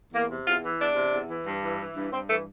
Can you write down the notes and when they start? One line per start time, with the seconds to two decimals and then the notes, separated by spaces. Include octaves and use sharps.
0.12 E2 A#3
0.30 C3
0.46 E2 F4
0.62 E3
0.79 E2 D4
0.95 C3
1.12 E2
1.29 E3
1.45 G2
1.62 E3
1.79 E3
1.95 G2
2.11 G2 C4
2.28 E3 A3